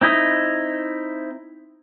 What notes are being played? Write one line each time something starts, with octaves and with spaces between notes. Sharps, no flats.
C4 D#4 E4 D#5